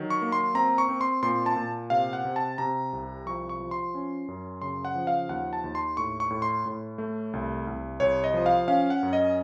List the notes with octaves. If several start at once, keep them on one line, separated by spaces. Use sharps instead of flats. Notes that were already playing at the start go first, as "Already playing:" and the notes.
Already playing: D#3 F#3
C#6
A#3
C6
C4 A#5
C#6
C4
C6
A#2 C6
A5
A#2
C3 F5
F#5
C3
A5
C3 A#5
C2
F3 C#6
C#6
F3
C6
C#4
F#2
C#3 C6
F#5
F3
F5
D#2 F#5
A5
D#2
C6
A2 C#6
C#6
A2
C6
A2
A3
C2
C2
C2 C#5
D#5
F3
F5
C#4 F5
F#5
F#2
D#5